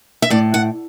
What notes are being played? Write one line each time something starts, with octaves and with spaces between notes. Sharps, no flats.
E5
A2 D5
F#5